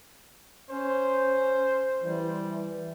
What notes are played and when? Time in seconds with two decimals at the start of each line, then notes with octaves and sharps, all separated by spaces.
0.69 C#4 C5
2.03 E3 G3